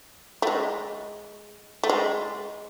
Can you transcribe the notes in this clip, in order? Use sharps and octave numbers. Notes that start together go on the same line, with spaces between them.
A3
G#3
A3
G#3